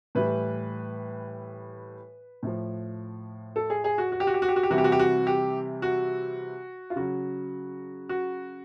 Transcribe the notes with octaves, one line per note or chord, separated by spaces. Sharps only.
A2 E3 G3 B4
A2 F3
A4
G#4
G#4
F#4
F#4
G4
F#4
G4
F#4
G4
F#4
G4
C3 E3 G3 F#4
G4
F#4
G4
F#4
G4
F#4
F4
C#3 F#3 F#4
F#4